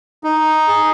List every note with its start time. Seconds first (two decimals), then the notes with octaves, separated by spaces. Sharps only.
0.24 D#4
0.68 G#4